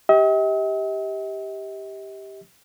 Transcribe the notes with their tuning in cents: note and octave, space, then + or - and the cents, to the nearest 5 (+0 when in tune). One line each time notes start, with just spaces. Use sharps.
G4 +0 D#5 +45